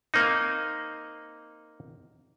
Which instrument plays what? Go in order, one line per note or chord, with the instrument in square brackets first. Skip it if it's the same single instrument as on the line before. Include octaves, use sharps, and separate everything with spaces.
[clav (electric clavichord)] A#3 C4 D#4